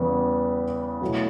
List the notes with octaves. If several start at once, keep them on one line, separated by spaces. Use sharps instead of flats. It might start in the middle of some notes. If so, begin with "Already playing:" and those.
Already playing: E2 C#3 G3 B3
B2 F#3 A3 E4